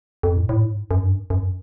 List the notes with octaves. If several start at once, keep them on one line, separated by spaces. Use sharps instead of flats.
F2
A2
A2
G#2
F#2
G2
F#2